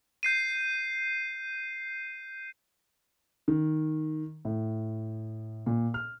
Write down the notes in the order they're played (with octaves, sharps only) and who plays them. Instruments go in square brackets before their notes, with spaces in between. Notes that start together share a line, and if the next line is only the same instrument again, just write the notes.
[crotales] G6 C7 D#7
[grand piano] D#3
A2
A#2
F6